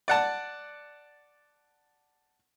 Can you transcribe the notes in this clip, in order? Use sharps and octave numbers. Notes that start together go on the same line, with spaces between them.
D5 F#5 A5